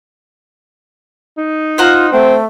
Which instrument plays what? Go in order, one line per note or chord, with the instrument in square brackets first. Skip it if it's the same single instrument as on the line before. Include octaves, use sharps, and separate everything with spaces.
[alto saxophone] D#4
[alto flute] F4 [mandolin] C5 F#5 A#5
[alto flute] A3 [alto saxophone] C4